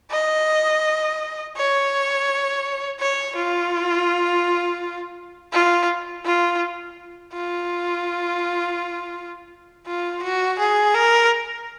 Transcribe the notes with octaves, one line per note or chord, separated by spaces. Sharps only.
D#5
C#5
C#5
F4
F4
F4
F4
F4
F#4
G#4
A#4